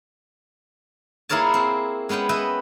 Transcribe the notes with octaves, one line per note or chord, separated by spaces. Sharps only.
A#3 E4 G#4 A#4 C#5 A5
C4
G#3 B3 C#4 F#5 G5
B4 D#5 E5 F#5 G5